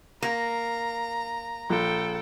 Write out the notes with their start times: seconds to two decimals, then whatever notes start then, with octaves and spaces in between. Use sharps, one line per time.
0.22 A#3 A#5
1.70 A#1 A4 G5